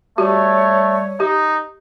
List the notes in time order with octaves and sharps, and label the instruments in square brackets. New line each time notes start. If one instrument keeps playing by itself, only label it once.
[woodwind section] G3 C#5 [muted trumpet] A3 [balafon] F#4 G4
[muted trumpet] D#4 [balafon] G4